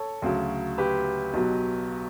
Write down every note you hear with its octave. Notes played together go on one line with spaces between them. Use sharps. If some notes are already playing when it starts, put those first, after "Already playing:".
Already playing: A4 C#5
D2 C#3 F#3
G4 B4
B1 B2 F#3